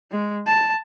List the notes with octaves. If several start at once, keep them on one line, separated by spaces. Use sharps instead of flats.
G#3
A5